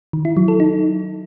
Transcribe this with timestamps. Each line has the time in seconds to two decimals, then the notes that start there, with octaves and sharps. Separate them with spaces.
0.13 D#3
0.25 E4
0.37 F#3
0.48 A4
0.60 D#4